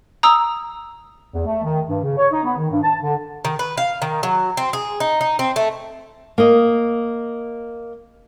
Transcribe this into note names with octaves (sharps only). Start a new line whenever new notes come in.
A#5 D#6 E6
E2
A3
D#3
G2
C#3
C#5
D#4
B3
D#3
G2
A5
D3
D#3
B4
F5
D#3
F#3
C4
G#4
D#4
D#4
C4
A3
A#3 D#5